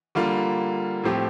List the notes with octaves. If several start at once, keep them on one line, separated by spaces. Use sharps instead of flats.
D3 G3 A#3 F4
A2 F3 A3 C4 G4